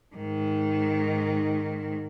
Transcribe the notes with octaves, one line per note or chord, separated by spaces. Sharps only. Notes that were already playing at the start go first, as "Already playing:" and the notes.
G#2 D#3